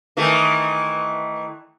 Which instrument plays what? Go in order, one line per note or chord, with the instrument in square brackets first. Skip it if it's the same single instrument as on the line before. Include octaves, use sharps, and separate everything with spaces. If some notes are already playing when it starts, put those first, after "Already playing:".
[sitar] D#3 E3 A3